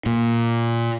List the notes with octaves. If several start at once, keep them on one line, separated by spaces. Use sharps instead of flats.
A#2